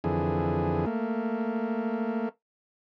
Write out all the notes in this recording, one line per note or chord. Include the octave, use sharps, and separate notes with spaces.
F2 D3 E3 G#4
A3 A#3